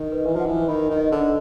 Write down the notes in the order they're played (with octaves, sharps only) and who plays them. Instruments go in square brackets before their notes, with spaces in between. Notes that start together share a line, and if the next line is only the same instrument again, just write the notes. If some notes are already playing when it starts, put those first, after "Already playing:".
Already playing: [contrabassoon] D#3 [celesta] D#5
[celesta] B4
[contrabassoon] E3
[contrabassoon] F3 [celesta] F#5
[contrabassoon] E3
[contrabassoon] D#3 [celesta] B5
[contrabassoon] D#3
[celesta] D#5
[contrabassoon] D3